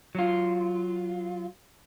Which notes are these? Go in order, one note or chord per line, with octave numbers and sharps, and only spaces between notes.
F#3 F4